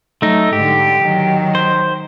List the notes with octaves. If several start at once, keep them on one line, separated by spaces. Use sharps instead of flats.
F#3 A3 D#4
G#2 D3 G4
D#3 F#3
C5